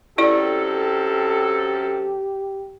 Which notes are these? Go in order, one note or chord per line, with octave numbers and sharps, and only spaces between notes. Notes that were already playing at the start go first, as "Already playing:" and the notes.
F#2 C4 E4 G4 A4 D5